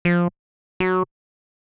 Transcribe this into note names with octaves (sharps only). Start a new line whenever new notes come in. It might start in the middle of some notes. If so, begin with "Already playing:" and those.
F3
F#3